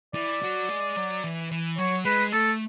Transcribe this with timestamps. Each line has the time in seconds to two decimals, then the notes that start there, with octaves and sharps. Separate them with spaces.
0.15 E3 D5
0.42 F#3
0.69 G#3
0.97 F#3
1.24 E3
1.52 E3
1.78 F#3 C#5
2.05 G#3 B4
2.33 A3 A4